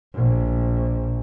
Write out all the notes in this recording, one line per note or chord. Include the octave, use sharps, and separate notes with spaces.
A#1